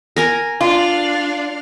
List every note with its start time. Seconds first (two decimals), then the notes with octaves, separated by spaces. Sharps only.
0.16 A#4 G#5 A#5
0.61 D4 F4 D5 F5